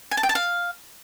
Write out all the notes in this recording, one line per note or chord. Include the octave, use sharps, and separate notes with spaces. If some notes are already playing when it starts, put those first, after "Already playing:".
G#5
A5
G5
A5
F5